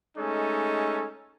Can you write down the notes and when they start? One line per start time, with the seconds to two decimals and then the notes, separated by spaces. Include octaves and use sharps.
0.17 G#3 A3 C#4 D#4 A4